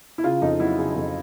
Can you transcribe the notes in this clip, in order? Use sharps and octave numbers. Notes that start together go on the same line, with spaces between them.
E4
C#3 F4
F2 D#4
F#3 E4
C#3 G#4
F2